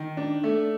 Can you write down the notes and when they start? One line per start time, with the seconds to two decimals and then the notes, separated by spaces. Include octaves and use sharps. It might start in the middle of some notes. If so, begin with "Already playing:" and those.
Already playing: D#3
0.17 D4
0.44 A3